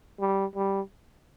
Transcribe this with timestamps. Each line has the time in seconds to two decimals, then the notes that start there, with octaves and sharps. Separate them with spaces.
0.20 G3
0.56 G3